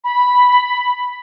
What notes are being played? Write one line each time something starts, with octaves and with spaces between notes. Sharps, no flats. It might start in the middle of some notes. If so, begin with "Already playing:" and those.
B5